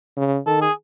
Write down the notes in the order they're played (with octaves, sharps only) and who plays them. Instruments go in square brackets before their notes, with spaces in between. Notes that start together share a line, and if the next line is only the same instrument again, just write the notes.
[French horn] C#3
[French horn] D#3 [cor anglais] A4
[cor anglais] G#4